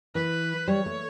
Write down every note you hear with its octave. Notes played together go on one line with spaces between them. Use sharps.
E3 B4
G3 C#5
A3